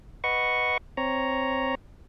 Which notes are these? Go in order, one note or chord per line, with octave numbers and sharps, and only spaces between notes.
B4 D#5 F#5 C#6
C4 C#5 A#5